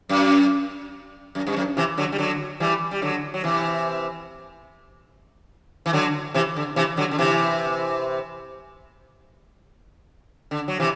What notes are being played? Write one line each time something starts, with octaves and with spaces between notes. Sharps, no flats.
F#2
F#2
G2
F#2
C3 E3
D3 F#3
G3
D3 F#3
E3 G3
G3
D3 F#3
F#3
C3 E3
E3
D3 F#3
C3 E3
D3
C3 E3
D3 F#3
D3
C3 E3
D3
F#3
C3 E3